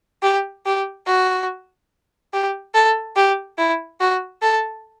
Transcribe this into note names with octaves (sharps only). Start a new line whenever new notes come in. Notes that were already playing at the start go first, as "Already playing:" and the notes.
G4
G4
F#4
G4
A4
G4
E4
F#4
A4